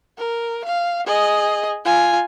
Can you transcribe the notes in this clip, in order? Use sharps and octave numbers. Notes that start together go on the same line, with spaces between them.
A#4
F5
G#4 D#5
F4 G#5